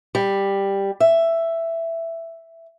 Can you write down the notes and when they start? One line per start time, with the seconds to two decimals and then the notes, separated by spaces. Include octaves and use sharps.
0.15 G3
1.00 E5